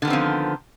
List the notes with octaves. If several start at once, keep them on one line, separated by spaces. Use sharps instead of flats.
D3 D#3 F3 B3 C4